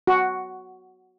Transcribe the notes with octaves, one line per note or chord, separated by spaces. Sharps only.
F#4